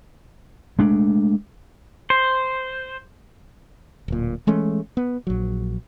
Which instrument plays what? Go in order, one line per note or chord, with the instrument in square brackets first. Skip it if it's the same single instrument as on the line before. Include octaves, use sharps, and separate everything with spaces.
[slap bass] G#3 A3 D4
[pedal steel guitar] C5
[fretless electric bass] D1 A#2
E3 G#3 A3 C#4
B3
A#1 F#3